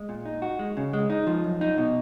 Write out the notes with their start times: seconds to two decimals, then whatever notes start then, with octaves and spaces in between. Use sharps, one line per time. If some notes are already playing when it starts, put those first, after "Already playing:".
Already playing: G#3
0.09 A#2
0.26 D#4
0.42 F#4
0.59 G#3
0.77 C#3
0.93 G#3
1.10 D#4
1.27 F3
1.44 F#2
1.61 D#4
1.78 B2